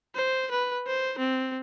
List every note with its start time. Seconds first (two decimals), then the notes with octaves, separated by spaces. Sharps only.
0.15 C5
0.51 B4
0.87 C5
1.19 C4